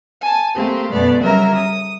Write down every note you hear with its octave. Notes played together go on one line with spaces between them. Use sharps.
G#5 A5
A3 A#3 C4 G4
F#2 B2 A3 B3 D5
C#3 F#3 G3 A#4 E5 A#5
D#6